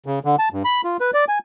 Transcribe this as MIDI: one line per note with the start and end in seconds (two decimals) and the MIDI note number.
0.06 0.19 49
0.25 0.36 50
0.39 0.49 81
0.53 0.63 43
0.65 0.81 83
0.84 0.97 65
1.00 1.11 71
1.14 1.25 74
1.28 1.39 80